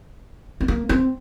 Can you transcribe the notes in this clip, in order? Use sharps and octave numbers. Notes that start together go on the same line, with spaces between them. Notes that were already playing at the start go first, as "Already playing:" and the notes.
C4
A#3
C4